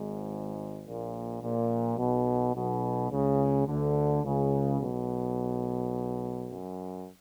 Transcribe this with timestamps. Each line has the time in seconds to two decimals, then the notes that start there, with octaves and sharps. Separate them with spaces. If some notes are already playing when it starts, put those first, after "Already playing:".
Already playing: G#1 G#2
0.84 A#1 A#2
1.41 A#1 A#2
1.97 B1 B2
2.54 B1 B2
3.10 C#2 C#3
3.66 D2 D3
4.23 C#2 C#3
4.79 B1 B2
6.49 F#2